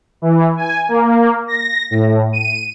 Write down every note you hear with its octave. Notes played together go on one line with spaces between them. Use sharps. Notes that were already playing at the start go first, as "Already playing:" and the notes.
E3
G#5
A#3
A#6
A2
D#7